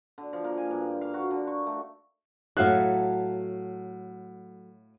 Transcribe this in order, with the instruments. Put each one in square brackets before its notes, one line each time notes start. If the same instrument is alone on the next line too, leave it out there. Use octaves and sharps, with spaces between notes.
[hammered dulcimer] D3
F3
A#3
G#5
G2
F5
F#4
D3
C#6
A3
[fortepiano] A2 F5 F#6 [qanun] F#3 A3